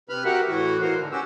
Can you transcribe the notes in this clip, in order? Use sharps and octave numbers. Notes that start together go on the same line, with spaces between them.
C3 B4 B5 F6
F#4 G4 A#4 E5 F#5
A2 E3 F#4
A#2 E3 F#4 A#4 C5
G#2 D3
C#4 F#4 G4 E6